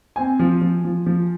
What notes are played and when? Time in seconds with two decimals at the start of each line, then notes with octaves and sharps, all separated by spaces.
0.16 C4 G#5
0.39 F3
0.61 F3
0.84 F3
1.06 F3